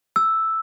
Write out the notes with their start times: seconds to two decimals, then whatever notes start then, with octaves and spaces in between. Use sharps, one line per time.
0.16 E6